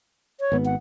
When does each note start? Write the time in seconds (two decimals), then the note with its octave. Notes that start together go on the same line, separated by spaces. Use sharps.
0.40 C#5
0.52 G#1 B3
0.65 F#5